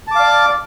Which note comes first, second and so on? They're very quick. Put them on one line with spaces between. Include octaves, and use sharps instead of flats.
A5 D6 F5 D5